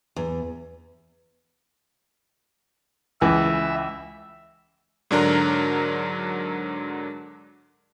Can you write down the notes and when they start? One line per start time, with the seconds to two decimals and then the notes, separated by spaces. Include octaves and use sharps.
0.16 E2
3.21 C#2 E3 E5
5.11 G#2 D3 F#3 D4 A#4 A#5